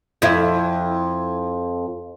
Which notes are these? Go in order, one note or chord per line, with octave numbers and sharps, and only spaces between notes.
F2 E4